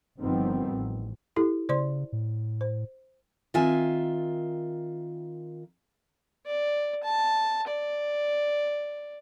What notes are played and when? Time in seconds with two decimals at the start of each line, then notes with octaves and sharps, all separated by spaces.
0.19 G1 D#3 F3 G3 B3 C4
0.68 A1
1.36 E4 G4 A4
1.69 C#3 C5 D5 C6
2.12 A2
2.61 C5
3.54 D#3 C4 F4 E5 G#5
6.46 D5
7.04 A5
7.67 D5